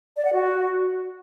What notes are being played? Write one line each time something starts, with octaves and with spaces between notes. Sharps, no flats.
D5
F#5
F#4